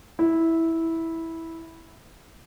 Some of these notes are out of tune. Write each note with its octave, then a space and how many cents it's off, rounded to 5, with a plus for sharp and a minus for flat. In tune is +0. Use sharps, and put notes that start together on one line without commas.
E4 -10